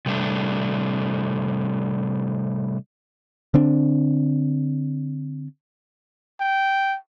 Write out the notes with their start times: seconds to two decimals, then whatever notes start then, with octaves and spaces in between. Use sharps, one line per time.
0.06 C3 G3 A3 D4
3.54 D3 C4 D4
6.40 G5